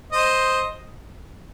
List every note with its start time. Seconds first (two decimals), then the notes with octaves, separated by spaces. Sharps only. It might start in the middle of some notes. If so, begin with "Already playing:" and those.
0.12 C5 D#5